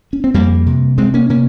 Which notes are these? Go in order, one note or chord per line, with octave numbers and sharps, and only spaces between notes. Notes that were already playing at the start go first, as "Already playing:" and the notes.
C#4
C4
F2 G3 A#3
C3
C3 G#3 C4
A#3 C#4
C3 A#3 C#4